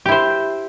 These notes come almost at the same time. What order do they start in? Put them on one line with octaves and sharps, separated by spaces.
G4 E4 C5